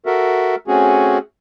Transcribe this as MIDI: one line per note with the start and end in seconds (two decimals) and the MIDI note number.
0.06 0.55 66
0.06 0.55 69
0.06 0.55 70
0.06 0.55 76
0.68 1.18 57
0.68 1.18 60
0.68 1.18 61
0.68 1.18 66
0.68 1.18 68